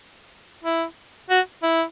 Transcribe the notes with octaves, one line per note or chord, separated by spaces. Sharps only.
E4
F#4
E4